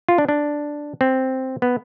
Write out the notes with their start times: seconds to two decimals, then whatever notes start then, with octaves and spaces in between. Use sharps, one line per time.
0.09 F4
0.18 D4
0.28 D4
1.01 C4
1.62 B3